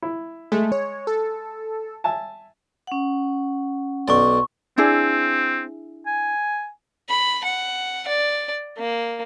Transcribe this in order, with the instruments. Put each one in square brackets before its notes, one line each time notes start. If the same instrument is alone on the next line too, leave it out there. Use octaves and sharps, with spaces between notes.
[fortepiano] E4
[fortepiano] G#3 [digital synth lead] A3
[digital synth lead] C#5
A4
[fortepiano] E5 G#5 A5
[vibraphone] C#4 F#5
[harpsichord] B1 D5 [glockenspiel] C6 C#6
[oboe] C4 [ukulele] D4 E4 G#4
[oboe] G#5
[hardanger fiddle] B5
F#5
D5
A#3